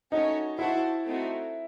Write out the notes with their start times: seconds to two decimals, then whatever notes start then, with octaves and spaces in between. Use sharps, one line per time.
0.12 A3 C#4 D#4 F#4 C#5
0.58 E4 F#4 C5 F#5 A5
1.05 A3 C4 D#4 F#4 A4